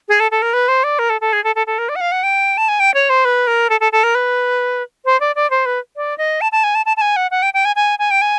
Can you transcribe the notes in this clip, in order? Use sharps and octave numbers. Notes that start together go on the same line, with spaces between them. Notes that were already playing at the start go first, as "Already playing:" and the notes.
G#4
A4
A4
A#4
B4
C5
D5
A#4
A4
A4
G#4
A4
A4
A4
A#4
D5
F#5
F5
F#5
G5
A5
G#5
G5
C#5
C5
B4
A#4
A4
A4
A4
A#4
B4
C5
D5
D5
C5
B4
D5
D#5
A5
A5
G#5
A5
A5
A5
G#5
F#5
F#5
G5
G5
G#5
G#5
G#5
G5
G#5